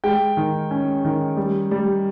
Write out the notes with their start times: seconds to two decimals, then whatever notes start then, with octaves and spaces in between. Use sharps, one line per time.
0.04 G#3 G5
0.37 D#3
0.71 C#4
1.04 D#3
1.37 G3
1.71 G3